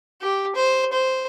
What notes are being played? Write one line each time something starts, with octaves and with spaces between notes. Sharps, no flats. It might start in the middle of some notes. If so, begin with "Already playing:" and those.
G4
C5
C5